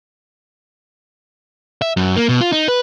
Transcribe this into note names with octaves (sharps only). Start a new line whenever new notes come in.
E5
F#2
A#3
B2
F4
D#4
B4